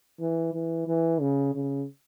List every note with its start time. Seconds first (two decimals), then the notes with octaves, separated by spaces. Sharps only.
0.20 E3
0.54 E3
0.87 E3
1.21 C#3
1.55 C#3